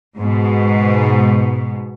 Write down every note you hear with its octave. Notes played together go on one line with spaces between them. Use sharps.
G#2 B2